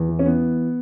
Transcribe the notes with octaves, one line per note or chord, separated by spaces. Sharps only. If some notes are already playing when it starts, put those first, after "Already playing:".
Already playing: E2
E3
C#4
E3 B3